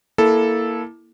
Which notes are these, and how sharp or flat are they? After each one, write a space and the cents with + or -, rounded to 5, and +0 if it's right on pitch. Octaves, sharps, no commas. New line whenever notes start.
A#3 +10 E4 +0 A4 -10